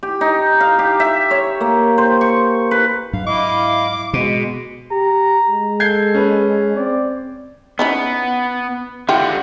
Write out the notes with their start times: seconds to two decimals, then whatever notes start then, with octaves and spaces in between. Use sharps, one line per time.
0.03 G4
0.21 D#4
0.60 F5
0.79 G4
1.00 E5
1.31 C#5
1.61 A#3
1.98 C5
2.21 C#6
2.71 B4
3.13 G#2 F#3 D4 F5
3.26 E4 D#5 F5 D6
4.13 B2 G#3
4.91 G4 A#5
5.50 G#3
5.80 A4 G6 G#6 C7
6.14 C#4 B4
6.76 C4 D5
7.79 B3 C#4 D#4 E4
9.09 D3 E3 F4 G4 F#5 G5